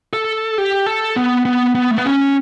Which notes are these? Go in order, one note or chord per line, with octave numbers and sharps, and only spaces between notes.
A4
G4
A4
B3
B3
B3
A3
B3
C#4